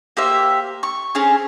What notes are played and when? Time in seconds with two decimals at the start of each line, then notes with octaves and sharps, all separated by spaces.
0.17 A#3 G4 C5 E5
0.83 C#6
1.15 C4 C#4 G#4